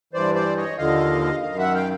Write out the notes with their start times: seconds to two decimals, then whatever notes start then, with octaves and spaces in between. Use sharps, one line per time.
0.13 G2 E3 C5 D5
0.35 C5 D5
0.57 C#5 D#5
0.78 D#2 D3 F3 D#5 F5
1.42 F#2 D#3 D#5 F5
1.58 E5 F#5
1.74 F5 G5